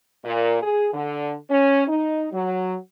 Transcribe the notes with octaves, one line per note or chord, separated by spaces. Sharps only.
A#2
G#4
D3
C#4
D#4
F#3